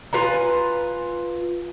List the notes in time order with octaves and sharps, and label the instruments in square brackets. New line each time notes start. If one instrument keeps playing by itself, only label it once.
[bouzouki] F4 B4 G#5 A#5